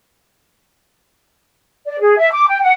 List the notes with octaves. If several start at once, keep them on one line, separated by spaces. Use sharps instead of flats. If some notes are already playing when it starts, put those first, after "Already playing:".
D5
G#4
E5
D6
G5
F#5